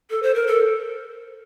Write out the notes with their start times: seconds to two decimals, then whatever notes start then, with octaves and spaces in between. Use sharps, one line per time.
0.10 A4
0.23 C5
0.35 A#4
0.47 A4